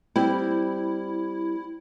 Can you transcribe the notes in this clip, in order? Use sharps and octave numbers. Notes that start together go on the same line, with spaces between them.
G3 C4 E4